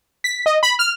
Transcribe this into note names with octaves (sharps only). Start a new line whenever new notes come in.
B6
D#5
B5
F6